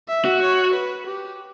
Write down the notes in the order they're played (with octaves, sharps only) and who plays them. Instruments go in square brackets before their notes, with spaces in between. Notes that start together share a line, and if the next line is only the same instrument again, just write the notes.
[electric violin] E5
[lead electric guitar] F#4
[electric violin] C#5
B4
G4